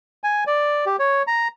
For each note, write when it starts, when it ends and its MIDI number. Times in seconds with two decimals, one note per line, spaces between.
0.24 0.44 80
0.47 0.85 74
0.86 0.96 67
0.99 1.22 73
1.27 1.48 82